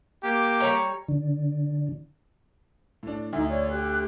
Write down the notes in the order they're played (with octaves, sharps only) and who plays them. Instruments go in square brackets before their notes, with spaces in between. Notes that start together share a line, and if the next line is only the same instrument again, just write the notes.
[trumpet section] A#3 G4
[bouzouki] G3 C#5 A#5
[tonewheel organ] D3
[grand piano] A2 D4
[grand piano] D2 [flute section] D#4 E5
[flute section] C#5 D5
G4 F#6